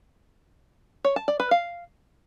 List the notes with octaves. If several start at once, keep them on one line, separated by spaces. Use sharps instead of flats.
C#5
A5
D5
B4
F5